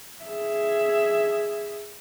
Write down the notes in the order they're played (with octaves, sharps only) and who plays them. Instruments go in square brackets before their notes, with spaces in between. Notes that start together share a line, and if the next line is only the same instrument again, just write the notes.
[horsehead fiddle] G#4 E5